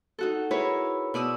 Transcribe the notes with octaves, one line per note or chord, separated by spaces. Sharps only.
D#4 F#4 A4
E4 G#4 A#4 B4 C#5 E5
B2 D5 D#6 E6